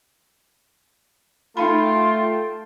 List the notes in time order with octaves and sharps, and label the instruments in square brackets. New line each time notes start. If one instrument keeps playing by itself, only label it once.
[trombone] A3 [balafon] D#4 F5 B5 [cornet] F4 [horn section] G5 A5 C6